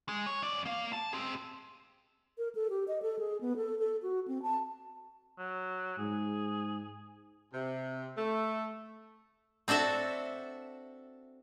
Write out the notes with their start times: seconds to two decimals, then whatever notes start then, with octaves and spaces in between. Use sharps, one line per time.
0.09 G#3
0.27 C#5
0.43 F#2 D5
0.66 A#3 F5
0.93 A5
1.13 C4 G#4
2.37 A#4
2.55 A4
2.70 G4
2.88 D#5
3.02 A4
3.19 G#4
3.41 B3
3.57 A4
3.79 A4
4.03 F#4
4.28 C4
4.42 A5
5.38 F#3
5.98 G#2 G#4
7.53 C3
8.17 A3
9.68 C4 D4 F#4 A4 E5